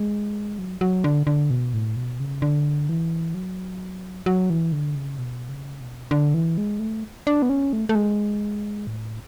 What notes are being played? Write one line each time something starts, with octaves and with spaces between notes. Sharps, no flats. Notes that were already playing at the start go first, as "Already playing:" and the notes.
Already playing: G#3
F#3
F#3
D3
D3
B2
A2
B2
C#3
D3
E3
F#3
F#3
E3
D3
C#3
B2
C#3
B2
D3
E3
G#3
A3
D4
B3
C#4
A3
A3
G#3
A2